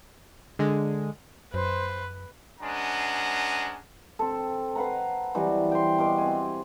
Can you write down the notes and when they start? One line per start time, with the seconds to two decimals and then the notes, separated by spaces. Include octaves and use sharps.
0.59 D3 G#3
1.54 F#2 B4 C5
2.61 G#3 C#4 D4 B4 F#5 A#5
4.19 C4 A4
4.76 B4 F5 F#5 A#5
5.35 E3 F#3 G3 C4
5.72 G5 C6
5.98 B2 C6 D6
6.18 C4 G#5